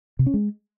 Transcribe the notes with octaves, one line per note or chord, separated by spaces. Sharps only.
C3
C#4
G#3